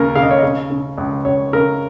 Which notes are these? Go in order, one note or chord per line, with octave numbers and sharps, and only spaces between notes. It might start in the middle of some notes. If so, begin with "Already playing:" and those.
Already playing: D#2 C#3 A#4
C#3 F5
D#5
C#5
C#3 D#5
C#3
C#2
C#2 C#5
C#3 A#4